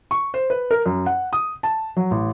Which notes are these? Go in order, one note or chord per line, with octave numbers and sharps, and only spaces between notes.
C#6
C5
B4
A#4
F#2
F#5
D#6
A5
F#3
A1